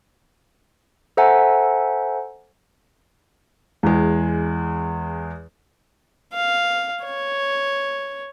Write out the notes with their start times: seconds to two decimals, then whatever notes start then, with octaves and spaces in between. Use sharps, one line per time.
1.17 A4 C5 E5 F#5 G#5 A#5
3.83 E2 G#3
6.34 F5
7.05 C#5